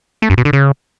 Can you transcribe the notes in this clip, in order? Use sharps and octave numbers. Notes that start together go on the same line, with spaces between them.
A3
F#2
B2
D3
C#3